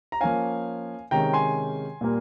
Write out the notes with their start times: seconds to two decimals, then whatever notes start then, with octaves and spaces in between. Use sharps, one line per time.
0.12 A#5
0.21 F3 A#3 C#4 F5 G#5
1.11 C3 D#3 G#3 C#4 G5 A#5
1.33 G#5 C6
2.01 A#2 G3 A#3